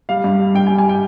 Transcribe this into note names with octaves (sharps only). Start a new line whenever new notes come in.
G3 F5
G2
G3
G2 G5
G#5
G3
G#5
G5